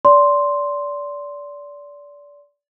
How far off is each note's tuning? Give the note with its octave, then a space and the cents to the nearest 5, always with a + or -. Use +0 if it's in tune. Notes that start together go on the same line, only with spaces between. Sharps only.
D5 -25 C6 +0